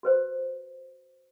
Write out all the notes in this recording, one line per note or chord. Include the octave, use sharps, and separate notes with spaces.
F#4 B4 C5